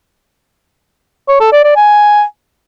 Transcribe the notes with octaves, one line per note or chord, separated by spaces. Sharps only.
C#5
A4
D5
D5
G#5